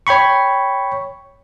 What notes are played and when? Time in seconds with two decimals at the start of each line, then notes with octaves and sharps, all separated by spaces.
0.07 C#5 G5 B5 C#6